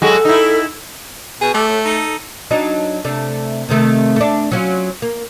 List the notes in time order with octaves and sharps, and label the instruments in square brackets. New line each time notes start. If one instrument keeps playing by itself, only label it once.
[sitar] F#3 G#3 F#4 [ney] A4
[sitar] D#4 E4
[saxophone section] B2 [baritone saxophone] G#4
[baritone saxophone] A3 [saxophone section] G4 A4 D5
[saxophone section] A2
D#4 A4
[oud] F#3 D4 D#4
C3 A3 D4
C3 D#3 A3
A3 D4
F#3 C#4 F4
A#3